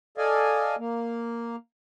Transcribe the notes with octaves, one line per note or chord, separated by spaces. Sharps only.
A4 D5 D#5 F5 G#5
A#3